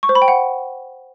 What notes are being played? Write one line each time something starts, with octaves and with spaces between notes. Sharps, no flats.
C#6
C5
B5
G5
F#5